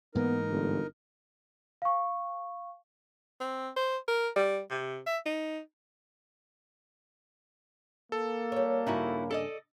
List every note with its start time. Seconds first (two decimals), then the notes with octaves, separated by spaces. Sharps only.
0.15 G#2 E3 A#3 B3 D#4 A#4
0.50 G1
1.82 F5 C#6
3.40 C4
3.76 C5
4.08 A#4
4.36 G3
4.71 C3
5.06 E5
5.26 D#4
8.12 A#3 A4
8.52 G3 C#5
8.87 G2 C#3 D#4 E4 F#4
9.31 A4 D5 D#5